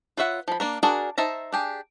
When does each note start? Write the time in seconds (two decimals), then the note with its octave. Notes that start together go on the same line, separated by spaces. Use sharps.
0.17 F4 B4 C#5 E5 F#5
0.48 F3 B5
0.60 A#3 D4 A#4
0.83 D4 F#4 G#4 A#4 D5
1.18 D#4 C5 E5 A5 A#5
1.53 D4 G4 G#4